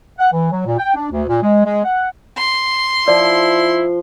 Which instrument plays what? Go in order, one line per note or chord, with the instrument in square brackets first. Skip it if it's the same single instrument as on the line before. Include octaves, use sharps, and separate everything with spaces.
[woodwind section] F#5
E3
F#3
A#2
G5
D4
D2
A#2
G#3
G#3
F#5
[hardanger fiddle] C6
[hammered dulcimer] F3 [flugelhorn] E4 [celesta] D5